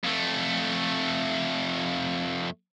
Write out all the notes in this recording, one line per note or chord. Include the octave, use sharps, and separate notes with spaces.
F2 A3